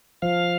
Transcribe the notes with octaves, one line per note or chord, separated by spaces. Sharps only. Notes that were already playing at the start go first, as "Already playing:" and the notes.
F3 F5